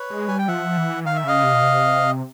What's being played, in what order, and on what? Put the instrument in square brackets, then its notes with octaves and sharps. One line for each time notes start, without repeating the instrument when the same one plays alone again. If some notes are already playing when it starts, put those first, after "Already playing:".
Already playing: [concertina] B4 C#5
[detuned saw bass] G#3
[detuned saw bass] G3 [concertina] G#5
[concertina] G5
[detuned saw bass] F3 [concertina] E5 F#5
[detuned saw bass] E3
[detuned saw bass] D#3 [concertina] F5
[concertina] E5
[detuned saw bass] C#3 [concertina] D#5 F5
[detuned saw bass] C3
B2
C3